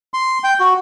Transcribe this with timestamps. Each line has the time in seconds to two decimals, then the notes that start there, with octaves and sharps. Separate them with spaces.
0.14 C6
0.44 G5
0.60 F#4